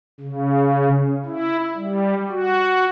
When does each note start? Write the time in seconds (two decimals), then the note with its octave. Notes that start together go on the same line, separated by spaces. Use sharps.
0.20 C#3
1.26 E4
1.77 G3
2.30 F#4